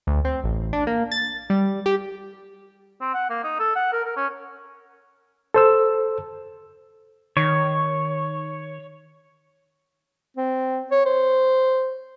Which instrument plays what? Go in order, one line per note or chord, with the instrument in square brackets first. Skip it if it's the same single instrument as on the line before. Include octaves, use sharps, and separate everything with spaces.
[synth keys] D2
C4
A1
D4
A#3
A6
G3
G4
[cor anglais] C4
F#5
A#3
D#4
A4
F#5
A#4
A#4
C#4
[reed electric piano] A4 C5 E6
[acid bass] D#3 [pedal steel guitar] C#5
[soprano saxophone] C4
C#5
C5